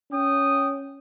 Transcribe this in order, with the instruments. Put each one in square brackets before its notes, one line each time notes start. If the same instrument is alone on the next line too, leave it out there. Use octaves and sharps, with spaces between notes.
[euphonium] C#4 [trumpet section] G5 D#6